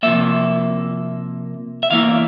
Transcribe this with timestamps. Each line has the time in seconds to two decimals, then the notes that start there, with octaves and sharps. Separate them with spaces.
0.03 C3 F3 A#3 E5
1.83 E5
1.90 E2 E3 A#3 E4 F5